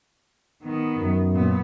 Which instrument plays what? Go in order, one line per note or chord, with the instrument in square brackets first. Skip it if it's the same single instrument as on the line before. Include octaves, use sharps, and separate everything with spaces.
[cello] D#3 B3
[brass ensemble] F#2
[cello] A#2 B3